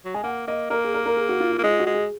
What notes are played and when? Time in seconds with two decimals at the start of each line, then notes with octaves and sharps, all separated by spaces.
0.05 F#3
0.14 G#3 G#5
0.24 A#3 F#5
0.47 A#3 D#5
0.70 A#3 A#4
0.84 G#4
0.94 A#4
1.06 A#4
1.17 G#4
1.29 F#4
1.40 F4
1.52 F4
1.58 A#3
1.63 G#3 F4
1.79 F#4
1.86 G#3
1.94 G#4